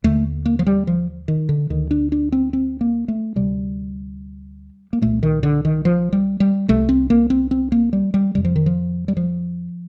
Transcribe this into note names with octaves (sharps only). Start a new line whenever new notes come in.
D#2 D3 A3
A#3
F3
G3
F3
D#3
D3
D2 D3 D#3
D4
D4
C4
C4
A#3
A3
D2 C3 G3
A#3
C2 A#2 A3
D#3
D3
D#3
F3
G3
G3
C2 C3 A3
C4
A#3
C4
C4
A#3
G3
G3
F2 C3 G3
F3
D#3
F3
G3
F3